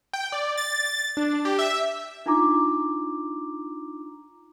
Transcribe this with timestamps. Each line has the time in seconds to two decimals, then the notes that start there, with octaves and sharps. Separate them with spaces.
0.13 G5
0.32 D5
0.57 A6
0.85 A6
1.17 D4
1.45 G4
1.59 E5
2.26 D4 D#4 F4 A#5 D6